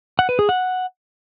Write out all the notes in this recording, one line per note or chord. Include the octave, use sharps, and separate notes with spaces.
F#5
B4
G#4
F#5